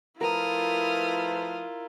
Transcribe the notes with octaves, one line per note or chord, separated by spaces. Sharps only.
F3 A3 E4 F4 A#4 B4 D#6 F6